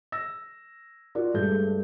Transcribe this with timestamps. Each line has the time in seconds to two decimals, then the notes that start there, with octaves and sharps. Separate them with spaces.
0.12 E6 A#6
1.15 F4 F#4 A#4 D5
1.34 G2 G#3 A3 A4 G6